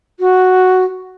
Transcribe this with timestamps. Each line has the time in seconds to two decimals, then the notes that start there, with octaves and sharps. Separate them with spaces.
0.19 F#4